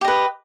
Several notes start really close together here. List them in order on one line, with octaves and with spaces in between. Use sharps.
G4 D#5 B4